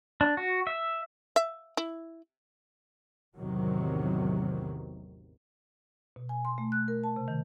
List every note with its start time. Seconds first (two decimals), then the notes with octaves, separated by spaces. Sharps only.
0.21 D4
0.37 F#4
0.67 E5
1.36 E5
1.77 E4
3.38 A1 E2 C3 D#3 F#3
6.16 B2
6.29 G#5
6.45 C6
6.58 A3
6.72 F#6
6.88 A#4
7.04 A5
7.16 C3
7.28 D#3